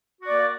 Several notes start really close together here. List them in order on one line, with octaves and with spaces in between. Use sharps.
F#4 D5 A#3